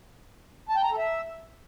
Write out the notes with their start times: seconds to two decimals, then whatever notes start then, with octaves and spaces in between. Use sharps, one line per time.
0.69 A5
0.76 G5
0.83 A#5
0.91 A4
0.98 E5